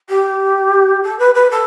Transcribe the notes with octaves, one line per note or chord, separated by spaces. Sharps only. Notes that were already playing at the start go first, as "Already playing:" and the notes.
G4
A4
B4
B4
A4